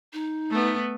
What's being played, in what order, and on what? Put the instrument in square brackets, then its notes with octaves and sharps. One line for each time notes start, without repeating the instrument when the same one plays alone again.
[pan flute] D#4
[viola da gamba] A3 B3